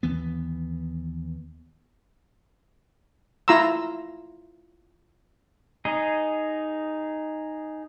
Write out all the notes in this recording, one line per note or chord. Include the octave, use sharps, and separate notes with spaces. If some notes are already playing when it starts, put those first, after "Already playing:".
D#2 E3 B3
E4 F4 A#5 C6 E6
D#4 G#4 D#5